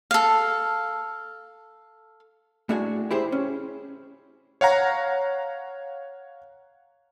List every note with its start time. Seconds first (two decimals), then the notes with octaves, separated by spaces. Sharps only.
0.11 A4 F5
2.69 A2 A3 D4 F#4 G#4 G#5
3.11 E4 G4 G#4 C5
3.32 C#4
4.61 C#5 F5 F#5 A#5